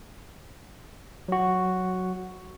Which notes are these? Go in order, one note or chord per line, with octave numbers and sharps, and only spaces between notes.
F#3 F#4